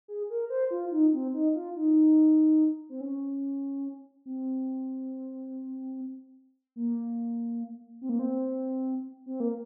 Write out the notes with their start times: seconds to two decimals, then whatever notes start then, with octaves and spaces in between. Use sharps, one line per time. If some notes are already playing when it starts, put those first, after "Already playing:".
0.08 G#4
0.30 A#4
0.50 C5
0.71 F4
0.91 D#4
1.13 C4
1.34 D#4
1.55 F4
1.76 D#4
2.89 C4
3.01 C#4
4.26 C4
6.76 A#3
8.01 C4
8.09 A#3
8.19 C4
9.26 C4
9.40 A#3